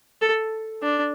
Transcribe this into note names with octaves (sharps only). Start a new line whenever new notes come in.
A4
D4